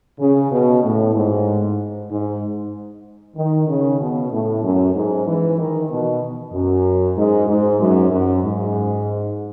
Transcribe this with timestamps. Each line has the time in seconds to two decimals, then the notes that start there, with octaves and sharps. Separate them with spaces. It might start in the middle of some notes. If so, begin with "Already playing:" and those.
0.20 C#3
0.52 B2
0.83 A2
1.15 G#2
2.10 G#2
3.37 D#3
3.69 C#3
4.01 B2
4.32 A2
4.64 F#2
4.95 G#2
5.28 E3
5.59 D#3
5.91 B2
6.53 F#2
7.17 G#2
7.49 G#2
7.81 F#2
8.12 F#2
8.44 G#2